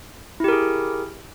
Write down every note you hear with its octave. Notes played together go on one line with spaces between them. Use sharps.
E4 G4 G#4 A#4